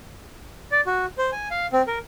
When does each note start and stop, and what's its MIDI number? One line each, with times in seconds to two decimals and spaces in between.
0.72 0.81 74
0.86 1.06 66
1.18 1.31 72
1.32 1.48 80
1.51 1.66 77
1.73 1.82 60
1.87 1.99 70